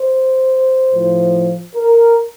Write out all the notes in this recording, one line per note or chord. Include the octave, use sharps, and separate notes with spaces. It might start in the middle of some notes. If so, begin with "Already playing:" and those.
Already playing: C5
A2 F3
A#4